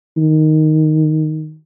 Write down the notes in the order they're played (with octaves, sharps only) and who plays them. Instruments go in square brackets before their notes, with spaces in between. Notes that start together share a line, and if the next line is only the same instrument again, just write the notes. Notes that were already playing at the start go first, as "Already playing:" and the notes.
[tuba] D#3